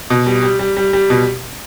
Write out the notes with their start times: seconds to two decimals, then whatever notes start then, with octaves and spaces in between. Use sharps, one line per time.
0.10 B2
0.27 G3
0.43 G3
0.59 G3
0.77 G3
0.93 G3
1.10 B2